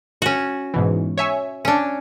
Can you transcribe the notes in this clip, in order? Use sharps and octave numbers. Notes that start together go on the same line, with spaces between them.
C#4 F#4
G#2 B2 E3
C#5 E5 G#5
C#4 D4